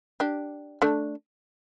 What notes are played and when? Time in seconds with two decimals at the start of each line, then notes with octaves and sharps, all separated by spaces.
0.20 D4 G4
0.82 A3 D4